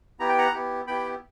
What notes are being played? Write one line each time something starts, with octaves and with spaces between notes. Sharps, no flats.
B3 E4 G4 A#5
G5
F#5 A#5
B3 E4 G4
B3 E4 G4 G5 B5